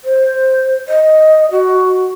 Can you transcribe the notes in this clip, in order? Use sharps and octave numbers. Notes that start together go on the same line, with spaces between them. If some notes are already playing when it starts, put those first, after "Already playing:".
C5
D#5
F#4